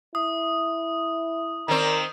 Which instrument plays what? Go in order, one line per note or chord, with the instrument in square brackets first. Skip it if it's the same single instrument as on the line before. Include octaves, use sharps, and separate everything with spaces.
[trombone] E4 [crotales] D#6
[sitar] D#3 C4 [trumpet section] A#4 D5 A#5